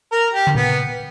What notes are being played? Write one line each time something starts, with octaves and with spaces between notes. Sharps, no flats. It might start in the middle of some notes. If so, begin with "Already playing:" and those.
A#4
G4
D3
A#2 C#3 B3